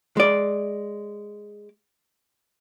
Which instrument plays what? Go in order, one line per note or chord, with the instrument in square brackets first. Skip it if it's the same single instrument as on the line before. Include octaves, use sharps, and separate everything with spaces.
[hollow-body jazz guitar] G#3 D5